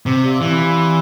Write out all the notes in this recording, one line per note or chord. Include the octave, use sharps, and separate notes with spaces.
C3 C4
G4 D5 F5
E3 C4
G4 D5 F5
C4